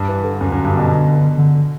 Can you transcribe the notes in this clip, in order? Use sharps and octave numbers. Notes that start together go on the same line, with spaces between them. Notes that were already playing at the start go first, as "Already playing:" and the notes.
Already playing: G2
E3
D3
F#2
F#2
G2
B2
D3